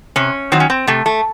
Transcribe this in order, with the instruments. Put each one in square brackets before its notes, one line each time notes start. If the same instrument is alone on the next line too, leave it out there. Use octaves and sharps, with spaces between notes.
[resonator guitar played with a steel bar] C3 C#4
D#3 F#3 C4
C#4
C4
C3 A3
A3